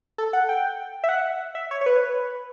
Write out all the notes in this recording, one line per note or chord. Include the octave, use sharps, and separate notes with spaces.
A4
F#5
G5
E5
F#5
E5
C#5
C#5
B4